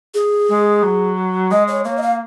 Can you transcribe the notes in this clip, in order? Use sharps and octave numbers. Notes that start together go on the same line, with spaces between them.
G#4
G#3
F#3
G#3 D#5
C#5
A#3 C#5
D#5
F5